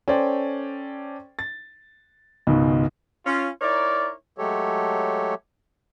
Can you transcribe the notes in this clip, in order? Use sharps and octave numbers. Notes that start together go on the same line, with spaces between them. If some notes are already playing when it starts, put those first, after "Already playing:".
C#4 A4 C5 D5 G5
A6
C#2 G#2 B2 D#3
C#4 F4
D#4 E4 A#4 C#5 D5
F#3 G#3 A3 G4 A4 C#5